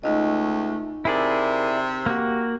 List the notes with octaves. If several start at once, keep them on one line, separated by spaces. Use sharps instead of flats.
C#2 A3 D#4 D#5
C3 E4 G#4 A#4 D5
A#3 F#4 G4